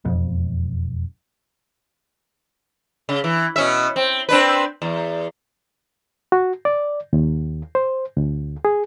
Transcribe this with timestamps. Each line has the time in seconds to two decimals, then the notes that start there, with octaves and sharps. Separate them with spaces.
0.05 E1 F2 B2
3.09 C#3
3.24 E3
3.56 B2 C#4 E5
3.96 C4
4.29 C4 D4 B4
4.82 E2
6.32 F#4
6.65 D5
7.13 D#2
7.75 C5
8.17 D2
8.65 G#4